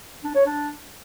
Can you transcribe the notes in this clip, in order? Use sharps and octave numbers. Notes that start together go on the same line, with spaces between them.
D4
C#5
D4